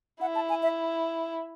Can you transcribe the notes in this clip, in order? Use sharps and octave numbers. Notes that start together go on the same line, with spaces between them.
E4 F#5
A5
G#5
E5